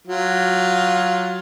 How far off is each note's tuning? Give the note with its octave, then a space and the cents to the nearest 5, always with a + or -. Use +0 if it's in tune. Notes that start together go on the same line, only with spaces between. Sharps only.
F#3 +0 F4 +10